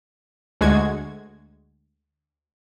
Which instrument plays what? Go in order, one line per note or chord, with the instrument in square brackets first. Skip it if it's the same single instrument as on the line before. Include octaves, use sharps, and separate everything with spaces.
[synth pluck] D2 G#3 F#4 G#6